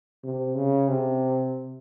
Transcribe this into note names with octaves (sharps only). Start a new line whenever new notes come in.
C3
C#3
C3